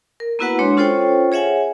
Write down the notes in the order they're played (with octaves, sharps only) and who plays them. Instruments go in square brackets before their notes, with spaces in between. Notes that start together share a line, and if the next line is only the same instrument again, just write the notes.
[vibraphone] A#4
A#3 B3 E4 F#4 B4 F#5
G#3 D4 C#5 C6
C#4 F4 A4 C5 C#5 G5
G#4 C#5 E5 F#5 G#5